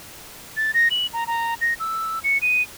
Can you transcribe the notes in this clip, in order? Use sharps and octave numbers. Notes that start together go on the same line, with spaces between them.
A6
A#6
F#7
A#5
A#5
A#6
E6
C#7
D#7